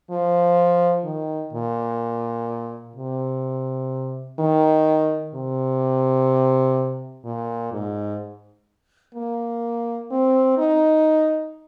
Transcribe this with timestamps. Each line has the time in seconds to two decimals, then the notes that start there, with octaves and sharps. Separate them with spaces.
0.11 F3
1.05 D#3
1.53 A#2
2.96 C3
4.40 D#3
5.35 C3
7.25 A#2
7.73 G#2
9.15 A#3
10.11 C4
10.58 D#4